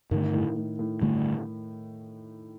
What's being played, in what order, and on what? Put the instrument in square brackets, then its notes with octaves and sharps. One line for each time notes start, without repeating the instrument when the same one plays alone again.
[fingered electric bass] G2 D3 A3 [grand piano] D#3
[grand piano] A2
A2
A2
[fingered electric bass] G2 D3 A3